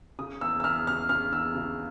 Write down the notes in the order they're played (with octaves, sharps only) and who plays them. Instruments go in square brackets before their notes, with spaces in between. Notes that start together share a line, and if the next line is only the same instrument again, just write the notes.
[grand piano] C#3 D#6
E2 E6
E6
E2 F6
C#3 F6
C#3 F6
E2 E6
C#3